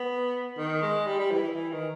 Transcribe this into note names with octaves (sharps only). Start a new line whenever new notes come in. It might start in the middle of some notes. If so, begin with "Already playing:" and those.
Already playing: B3
D#3
G#3
G3
G3
E3
E3
E3
D#3